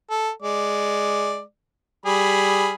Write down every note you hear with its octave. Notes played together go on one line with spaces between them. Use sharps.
A4
G#3 D5
G3 G#4 B5